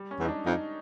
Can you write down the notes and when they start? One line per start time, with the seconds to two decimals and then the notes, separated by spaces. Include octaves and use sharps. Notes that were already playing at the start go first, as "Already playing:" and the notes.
Already playing: G3
0.11 C#4
0.19 E2
0.25 D#4
0.28 D4
0.46 F2 D#4